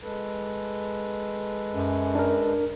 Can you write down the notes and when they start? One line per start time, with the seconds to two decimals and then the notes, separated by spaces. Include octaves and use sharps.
0.01 G#3 A4 B4
1.73 F#2
2.15 D4 A#4